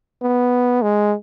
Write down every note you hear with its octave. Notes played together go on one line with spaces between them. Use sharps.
B3
G#3